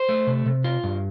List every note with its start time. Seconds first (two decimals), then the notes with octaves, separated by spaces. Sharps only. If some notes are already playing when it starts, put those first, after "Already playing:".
Already playing: C5
0.09 A3
0.27 C3
0.46 C3
0.64 F4
0.84 G2